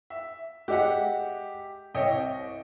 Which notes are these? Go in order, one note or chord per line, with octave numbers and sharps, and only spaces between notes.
E5
G#3 G4 D#5 E5 F#5
C2 C#5 D#5 E5 G5